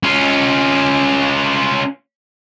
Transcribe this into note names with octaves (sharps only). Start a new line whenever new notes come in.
C#4 F4